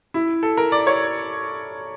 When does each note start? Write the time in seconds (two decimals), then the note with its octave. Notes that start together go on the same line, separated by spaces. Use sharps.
0.14 E4
0.43 A4
0.57 A#4
0.72 D5
0.87 C#5